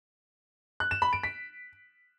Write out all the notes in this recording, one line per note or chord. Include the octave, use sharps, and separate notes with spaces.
F#6
E7
B5
D7
B6